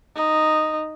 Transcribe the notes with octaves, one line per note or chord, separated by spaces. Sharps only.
D#4